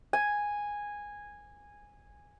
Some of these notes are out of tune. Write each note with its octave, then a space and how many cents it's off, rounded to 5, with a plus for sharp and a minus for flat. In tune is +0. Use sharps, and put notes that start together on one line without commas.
G#5 -10